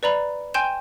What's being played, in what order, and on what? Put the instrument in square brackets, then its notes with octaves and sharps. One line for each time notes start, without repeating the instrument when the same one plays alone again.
[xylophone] B4 D5 A#5 B5
G5 G#5 C6 G6 E7